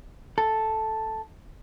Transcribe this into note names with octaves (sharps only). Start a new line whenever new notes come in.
A4